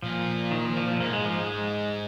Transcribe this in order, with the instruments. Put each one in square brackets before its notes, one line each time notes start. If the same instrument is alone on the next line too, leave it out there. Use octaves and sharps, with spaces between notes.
[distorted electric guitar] A#2 [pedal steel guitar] F3
[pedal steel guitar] D#3
F3
F3
F3
[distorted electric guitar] G#2 [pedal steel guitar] A#3
[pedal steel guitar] G#3
F3
G#3